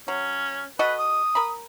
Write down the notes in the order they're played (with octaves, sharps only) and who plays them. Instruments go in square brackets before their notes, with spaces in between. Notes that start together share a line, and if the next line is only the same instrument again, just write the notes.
[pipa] F#3 [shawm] C#4
[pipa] F#4 A4 D#5 [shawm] B4
[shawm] D#6
[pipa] A#4 A#5 B5